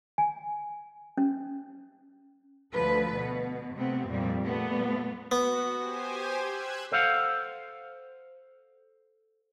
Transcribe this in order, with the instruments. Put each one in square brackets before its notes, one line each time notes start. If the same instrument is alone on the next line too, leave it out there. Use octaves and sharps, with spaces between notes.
[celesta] G#5
[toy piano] C#4
[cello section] D2 F3 A4 B4
B2
C3 A3 B3 C4
F2 A#2 G3
A#2 G3 A3 B3
[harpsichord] B3 [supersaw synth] F#4
[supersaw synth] G4 C5 G#5
E6 F#6 G#6
[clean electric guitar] A4 C5 D#5 F5 F#5